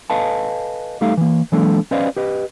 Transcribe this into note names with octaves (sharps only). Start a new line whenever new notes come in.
A4 B4 D#5 F5 G#5 A5
G3 A3 D#4 A4 F5
E3 A#3
E3 F#3 G#3 A#3 D4 A4
C#4 B4 C5 D5 D#5 F5
G4 B4 D#5